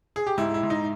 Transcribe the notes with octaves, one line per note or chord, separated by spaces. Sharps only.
G#4
G4
G#2 E4
E4
G#2
D#4